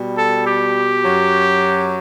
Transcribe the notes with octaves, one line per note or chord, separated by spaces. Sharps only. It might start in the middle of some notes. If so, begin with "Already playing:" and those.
Already playing: B2 G3
A4
G4
F#2 F#3